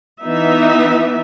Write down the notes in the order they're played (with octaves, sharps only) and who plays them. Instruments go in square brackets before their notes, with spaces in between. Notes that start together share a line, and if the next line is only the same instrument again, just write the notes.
[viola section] E3 B3 D#4 E5